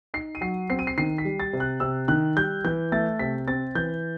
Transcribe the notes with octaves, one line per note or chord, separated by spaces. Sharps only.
D#4 C7
D#7
F#3 C7
C4 C7
D#7
C7
D#3 C7
B6
G3
A6
C3
F#6
C3 E6
D#3 F#6
G3 G6
E3 G6
A3 A6
C3 B6
C4 A6
E3 G6